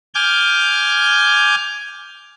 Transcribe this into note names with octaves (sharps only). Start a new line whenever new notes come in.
G#5 D6 F6 G6